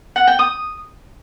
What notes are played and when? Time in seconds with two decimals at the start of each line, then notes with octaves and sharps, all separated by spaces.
0.16 F#5
0.27 G5
0.39 D#6